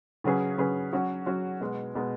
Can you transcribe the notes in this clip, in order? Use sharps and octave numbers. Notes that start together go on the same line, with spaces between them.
C#3 F#3 C#4 G#4 B4
C#3 F#3 C#4 G#4 B4
F#3 C#4 F#4
F#3 C#4 F#4
B2 G#3 B3
B2 G#3 B3